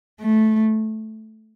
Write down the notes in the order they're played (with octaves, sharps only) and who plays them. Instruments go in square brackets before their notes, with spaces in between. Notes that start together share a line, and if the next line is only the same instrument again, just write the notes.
[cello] A3